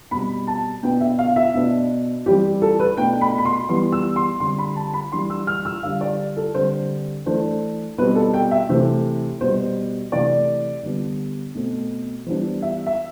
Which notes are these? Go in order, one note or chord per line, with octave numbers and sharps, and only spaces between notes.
B2 G3 C4 B5
A5
B2 B3 D4 G5
E5
F5
E5
B2 B3 D4
E3 G3 C4 G4
A4
B4
B2 A3 D4 G5
B5
B5
C6
E3 G3 B3 C6
E6
C6
D3 G3 C4 C6
B5
A5
B5
E3 G3 D4 C6
E6
F6
E6
D3 G3 D4 F5
D5
A4
D3 G3 C4 C5
E3 A3 D4 C5
B2 G3 C4 B4
A4
G5
E5
C3 E3 A3 C5
B2 G3 B3 C5
C3 E3 A3 D5
D3 G3 B3 D4
B2 A3 C4
E3 G3 B3 D4 C5
E5
E5